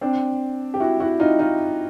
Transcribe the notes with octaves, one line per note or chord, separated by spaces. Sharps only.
C4 D4
G4
E4 F#4
E4 F#4
D#4 F4
D#4 F4